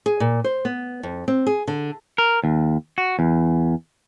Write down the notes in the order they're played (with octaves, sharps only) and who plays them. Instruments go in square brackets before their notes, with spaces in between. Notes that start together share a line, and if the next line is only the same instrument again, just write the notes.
[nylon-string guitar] G#4
A#2
C5
B3
F2
C4
G#4
D3
[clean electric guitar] A#4
D#2
F#4
E2